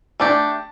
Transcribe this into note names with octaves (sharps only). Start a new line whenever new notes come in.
A3 D4 G4 A5